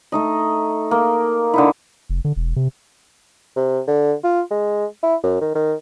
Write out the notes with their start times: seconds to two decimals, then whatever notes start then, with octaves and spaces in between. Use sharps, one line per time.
0.12 A3 D#4 D#5
0.91 A#3
1.54 D3 D#4 E4
2.09 F1
2.25 D3
2.36 E1
2.56 C3
3.56 C3
3.87 D3
4.24 F4
4.51 G#3
5.03 E4
5.24 F#2
5.41 D#3
5.55 D#3